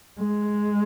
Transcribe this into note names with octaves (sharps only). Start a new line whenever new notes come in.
G#3